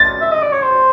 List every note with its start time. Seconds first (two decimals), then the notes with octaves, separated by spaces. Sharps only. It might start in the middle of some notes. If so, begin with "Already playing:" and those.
Already playing: A6
0.21 E5
0.32 D#5
0.42 D5
0.53 C#5
0.63 C5